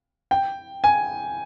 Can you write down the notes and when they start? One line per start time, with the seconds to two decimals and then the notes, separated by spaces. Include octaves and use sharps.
0.31 G5
0.84 G#5